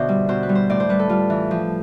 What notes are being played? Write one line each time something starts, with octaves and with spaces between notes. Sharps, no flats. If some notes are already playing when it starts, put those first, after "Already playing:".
Already playing: B2 D3 C5 D5 E5
G3
B2 C5
B4
G3
C5
A2 D5
C5
G3 B4
A4
G3 F4
E3
F3